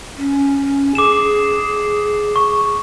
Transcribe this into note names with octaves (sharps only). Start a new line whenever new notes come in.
C#4
G#4 D6 E7
C#6